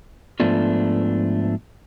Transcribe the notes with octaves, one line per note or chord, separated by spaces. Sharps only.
G#2 F3 A3 B3 D4 F4